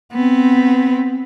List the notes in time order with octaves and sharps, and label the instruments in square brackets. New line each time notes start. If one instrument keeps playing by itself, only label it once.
[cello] B3 C4